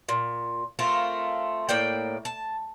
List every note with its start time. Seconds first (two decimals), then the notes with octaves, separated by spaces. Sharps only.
0.09 A#2
0.79 A3 C4 F4 A#4
1.69 A2 A#3 D5 G5
2.25 A5